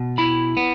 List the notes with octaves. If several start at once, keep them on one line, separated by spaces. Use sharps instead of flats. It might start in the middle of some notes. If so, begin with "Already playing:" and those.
Already playing: B2
E4 B5
B3